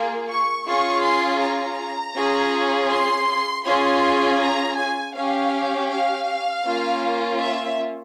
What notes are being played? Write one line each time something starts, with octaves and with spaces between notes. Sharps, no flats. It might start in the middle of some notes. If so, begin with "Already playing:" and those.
Already playing: A#3 F4 G#4
C#6
C#4 F4 G#4 C#6
C6
A#5
C#4 F4 G#4
C6
C#4 F4 G#4 C6
A#5
G#5
C#4 G4 F5
F5
A#3 C#4 F4
E5